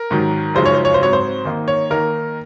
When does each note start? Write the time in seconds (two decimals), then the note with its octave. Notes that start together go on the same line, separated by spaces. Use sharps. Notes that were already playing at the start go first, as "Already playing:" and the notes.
Already playing: A#4
0.11 G#2 D#3 F#3
0.55 F#2 C#3 F3 G#3 D#4 C5
0.66 C#5
0.74 C5
0.85 C#5
0.94 C5
1.01 G#2 F#3 C4 C#5
1.13 C5
1.45 D#3 A#3 D#4
1.68 C#5
1.90 D#3 A#3 D#4 A#4